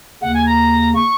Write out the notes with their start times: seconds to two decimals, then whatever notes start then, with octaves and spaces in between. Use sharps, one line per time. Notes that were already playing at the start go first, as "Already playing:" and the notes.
0.21 D#2 C#3 A#3 F#5
0.34 G#5
0.46 A#5
0.94 C#6